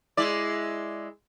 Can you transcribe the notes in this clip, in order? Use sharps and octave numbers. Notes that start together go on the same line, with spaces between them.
G#3 E4 D5